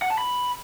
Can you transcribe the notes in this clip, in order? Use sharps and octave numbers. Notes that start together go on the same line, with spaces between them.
F#5
A5
B5